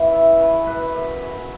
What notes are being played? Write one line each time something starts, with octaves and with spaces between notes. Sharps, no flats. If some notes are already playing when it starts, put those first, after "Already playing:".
Already playing: E3
C#3 E5
C#3 B4
F#2 B4
F#2
C#3